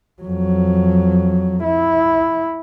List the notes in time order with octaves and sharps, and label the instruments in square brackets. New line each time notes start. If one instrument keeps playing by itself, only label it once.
[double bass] F2 F#3
E4